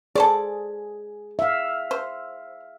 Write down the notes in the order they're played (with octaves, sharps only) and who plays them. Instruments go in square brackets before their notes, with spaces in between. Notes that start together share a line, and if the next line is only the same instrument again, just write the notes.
[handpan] G#4 [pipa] A4 C5 D5
[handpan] E5 F5
[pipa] C5